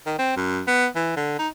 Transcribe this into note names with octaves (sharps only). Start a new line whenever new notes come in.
D#3
C4
F#2
B3
E3
D3
D#4